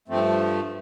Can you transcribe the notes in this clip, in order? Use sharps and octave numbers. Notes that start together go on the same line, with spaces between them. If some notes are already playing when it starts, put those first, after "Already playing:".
G2 F3 A3 C4